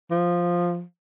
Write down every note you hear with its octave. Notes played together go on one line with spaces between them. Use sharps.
F3